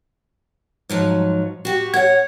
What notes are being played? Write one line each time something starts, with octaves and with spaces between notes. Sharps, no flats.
G#2 F3 F#3
F#4 G4
C#5 F#5 G#6